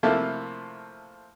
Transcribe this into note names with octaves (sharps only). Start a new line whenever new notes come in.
C3 F3 A3 A#3 E4 F4